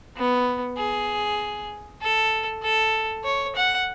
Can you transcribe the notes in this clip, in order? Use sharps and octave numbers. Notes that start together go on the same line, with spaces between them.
B3
G#4
A4
A4
C#5
F#5